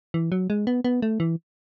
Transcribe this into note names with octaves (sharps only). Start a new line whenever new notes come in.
E3
F#3
G#3
B3
B3
A3
E3